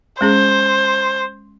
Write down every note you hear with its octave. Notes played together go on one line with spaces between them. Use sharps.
G#3 C#4 G#4 C5